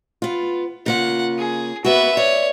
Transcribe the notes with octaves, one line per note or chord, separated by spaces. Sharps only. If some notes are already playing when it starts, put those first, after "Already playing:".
B3 F4
C#3 A#3 F4 F#5
G#4
A#3 B3 F#4 B4 E5
C#5 D5